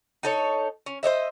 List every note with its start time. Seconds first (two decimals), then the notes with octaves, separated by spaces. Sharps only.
0.23 D#4 A4 C#5
0.86 C#4
1.03 C5 C#5 D#5 E5